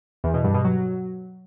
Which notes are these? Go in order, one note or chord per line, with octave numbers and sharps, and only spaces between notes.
E2
B2
G2
B2
F#3